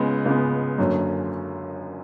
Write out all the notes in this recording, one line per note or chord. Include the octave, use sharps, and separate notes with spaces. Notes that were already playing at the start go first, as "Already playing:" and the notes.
Already playing: C#2 C#3 G#3 B3
C#2 C#3 G#3 B3
F#1 F#2 D3 F#3 C#4